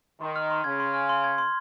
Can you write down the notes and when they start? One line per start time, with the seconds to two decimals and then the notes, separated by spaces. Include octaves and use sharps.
0.21 D#3 C6
0.36 F6
0.50 C6
0.64 C#3 G#6
0.80 C6
0.94 F6
1.09 C6
1.24 G#6
1.38 C6